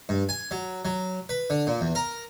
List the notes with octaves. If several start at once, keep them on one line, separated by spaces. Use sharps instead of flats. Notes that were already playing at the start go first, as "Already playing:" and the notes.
G2
G#5
F#3
F#3
B4
D3
A#2
E2
A#4